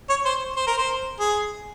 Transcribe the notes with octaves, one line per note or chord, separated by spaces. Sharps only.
C#5
C5
C5
A#4
C5
G#4